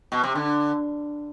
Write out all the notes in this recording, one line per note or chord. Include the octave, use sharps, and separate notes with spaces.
B2
C3
D3